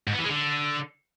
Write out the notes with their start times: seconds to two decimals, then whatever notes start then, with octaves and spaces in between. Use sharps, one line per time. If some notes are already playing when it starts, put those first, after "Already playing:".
0.07 G#2
0.13 B3
0.18 E3
0.24 G#3
0.30 D3